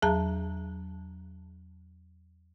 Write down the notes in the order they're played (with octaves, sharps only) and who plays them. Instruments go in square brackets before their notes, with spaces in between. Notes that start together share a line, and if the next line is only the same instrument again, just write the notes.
[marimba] E2 F#3 G#4 A5 A#5